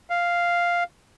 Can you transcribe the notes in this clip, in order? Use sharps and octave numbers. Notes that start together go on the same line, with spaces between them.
F5